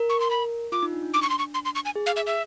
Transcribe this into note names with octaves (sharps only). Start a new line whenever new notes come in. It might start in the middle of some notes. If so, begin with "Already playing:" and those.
Already playing: A#4
C#6
C6
B5
F4 D6
D#4
D4
D4
D6
C#6
C6
C#6
C6
C6
C#6
G#5
G#4
F5
E5
E5